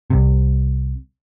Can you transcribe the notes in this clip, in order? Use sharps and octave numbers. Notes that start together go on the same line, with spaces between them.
C2 C3